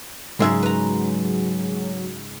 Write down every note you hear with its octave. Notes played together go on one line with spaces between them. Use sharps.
G#2 C#3 F#3 G#3 E5
B4 A#5